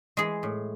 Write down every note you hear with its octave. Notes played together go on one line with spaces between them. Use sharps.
E3 G#3 G#4
A2